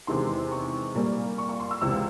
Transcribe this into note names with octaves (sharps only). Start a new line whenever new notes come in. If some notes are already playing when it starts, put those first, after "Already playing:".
E2 C3 D#3 G#3 C6
C#6
A#2 G3 A#3
C#6
C#6
C6
E6
C#2 C3 E3 E6